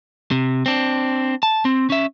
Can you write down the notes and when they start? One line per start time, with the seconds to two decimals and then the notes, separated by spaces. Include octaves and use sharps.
0.31 C3
0.66 C4 D4
1.43 A5
1.65 C4
1.90 C#4 E5